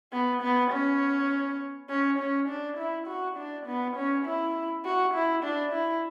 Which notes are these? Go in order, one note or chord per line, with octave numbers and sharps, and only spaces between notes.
B3
B3
C#4
C#4
C#4
D4
E4
F#4
D4
B3
C#4
E4
F#4
E4
D4
E4